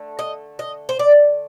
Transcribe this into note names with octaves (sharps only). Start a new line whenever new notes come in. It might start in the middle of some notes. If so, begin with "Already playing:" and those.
Already playing: D3 A3
D#5
D#5
C5
D5